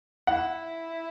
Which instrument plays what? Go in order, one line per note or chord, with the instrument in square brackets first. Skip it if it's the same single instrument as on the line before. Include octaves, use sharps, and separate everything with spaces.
[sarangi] E4 [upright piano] F#5